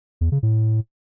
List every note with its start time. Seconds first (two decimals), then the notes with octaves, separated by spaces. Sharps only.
0.21 E2
0.32 C#3
0.43 A2